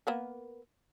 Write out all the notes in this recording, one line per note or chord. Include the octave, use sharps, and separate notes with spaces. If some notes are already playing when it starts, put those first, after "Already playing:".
A#3 B3 A#4